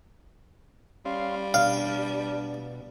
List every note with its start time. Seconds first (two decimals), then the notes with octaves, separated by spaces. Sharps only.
1.05 G3 C#4 F5 C6
1.54 B2 D4 F5